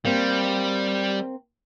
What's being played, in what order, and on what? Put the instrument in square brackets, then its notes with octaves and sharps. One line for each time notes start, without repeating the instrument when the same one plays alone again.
[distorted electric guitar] G3 [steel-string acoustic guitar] A#3 C4